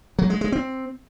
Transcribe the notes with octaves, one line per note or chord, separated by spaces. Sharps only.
F#3
G#3
G#3
C4